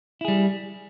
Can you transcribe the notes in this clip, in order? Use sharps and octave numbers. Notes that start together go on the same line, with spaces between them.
G3 E4 G#4